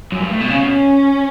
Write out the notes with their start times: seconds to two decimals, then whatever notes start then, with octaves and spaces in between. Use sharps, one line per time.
0.12 F#2
0.21 G2
0.31 A2
0.40 B2
0.50 C#3 C#4
0.63 B2